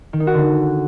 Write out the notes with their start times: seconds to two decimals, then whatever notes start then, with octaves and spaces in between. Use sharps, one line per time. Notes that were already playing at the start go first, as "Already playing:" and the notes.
0.13 D#3
0.20 D#4
0.27 F#4
0.34 D3